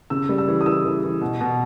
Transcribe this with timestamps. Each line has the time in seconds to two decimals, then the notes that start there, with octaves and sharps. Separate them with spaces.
0.10 C#3 E6
0.29 G3
0.38 E6
0.48 E3
0.61 D#6
0.66 E3 E6
0.85 E3
1.03 E3
1.21 B2
1.41 B2